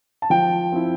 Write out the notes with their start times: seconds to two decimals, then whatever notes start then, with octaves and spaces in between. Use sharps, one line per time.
0.22 A5
0.30 F3 G5
0.72 C4 E4